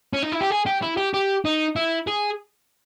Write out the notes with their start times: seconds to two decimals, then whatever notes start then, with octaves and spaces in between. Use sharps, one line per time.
0.13 C#4
0.23 D#4
0.32 E4
0.41 G4
0.51 G#4
0.66 G4
0.82 E4
0.97 G4
1.14 G4
1.45 D#4
1.76 E4
2.07 G#4